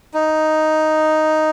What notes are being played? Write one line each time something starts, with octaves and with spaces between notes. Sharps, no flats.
D#4